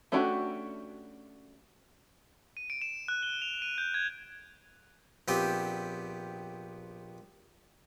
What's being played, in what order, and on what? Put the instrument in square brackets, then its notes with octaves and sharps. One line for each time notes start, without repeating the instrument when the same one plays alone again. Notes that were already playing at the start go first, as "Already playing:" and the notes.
[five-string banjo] A3 C#4 D4 F#4 G4
[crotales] D#7
D7
E7
F#6
G7
F7
D#7
G6
G#6
[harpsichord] A#1 B3 C4 G4